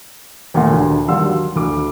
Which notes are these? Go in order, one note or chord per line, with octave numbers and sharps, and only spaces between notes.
D#2 A#2 A3 F#5 C6
D2 D3
D#2 G3 F5 F#5 C6 E6
F#3
D2 D6